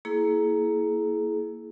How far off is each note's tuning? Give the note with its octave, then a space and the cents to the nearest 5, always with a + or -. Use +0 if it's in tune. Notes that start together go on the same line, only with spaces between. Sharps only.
A#3 +0 E4 +0 G#4 +30